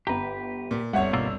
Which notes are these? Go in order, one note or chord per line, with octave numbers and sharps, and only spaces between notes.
G1 G4 B4 A#5
A#2
G1 C2 C#5 E5 F#5
B2 A#3 F4 E6